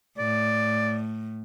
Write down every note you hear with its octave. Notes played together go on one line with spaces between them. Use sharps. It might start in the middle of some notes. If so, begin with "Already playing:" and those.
A2 D5